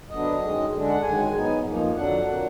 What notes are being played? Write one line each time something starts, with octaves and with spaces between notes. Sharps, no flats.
D2 D3 F#3 B3 D4 D#5
F#2 D#3 G#3
D3 G#3 D4
F#5
F#2 D#3 G#3 G#5
G#2 F#3 B3 D#4
F2 F3 A#3 D#4
F2 D3 F#3 D4 F#5
A#2 F#3 A#3 D4